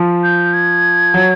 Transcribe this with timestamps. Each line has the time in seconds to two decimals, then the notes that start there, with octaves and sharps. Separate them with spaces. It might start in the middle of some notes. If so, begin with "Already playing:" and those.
Already playing: F3
0.23 G6
0.53 G#6
1.14 F#3